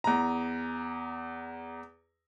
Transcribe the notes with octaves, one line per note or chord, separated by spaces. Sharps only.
E2 A#5